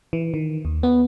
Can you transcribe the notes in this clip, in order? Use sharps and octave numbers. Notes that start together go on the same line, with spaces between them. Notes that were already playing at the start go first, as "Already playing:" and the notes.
E3
D#3
D#2
B3